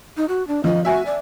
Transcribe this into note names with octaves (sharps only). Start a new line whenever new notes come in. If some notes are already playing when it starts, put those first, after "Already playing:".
D#4
F#4
D4
F3 D#5
F#4 E5 G#5
D5